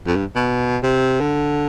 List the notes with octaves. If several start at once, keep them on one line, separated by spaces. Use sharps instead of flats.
F2
G2
B2
C3
D3